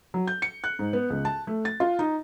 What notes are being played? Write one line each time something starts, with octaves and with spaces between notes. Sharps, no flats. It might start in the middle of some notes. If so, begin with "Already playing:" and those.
F#3
G6
C#7
F#6
G#2
B3
C#2
A5
A3
A6
F4
D#4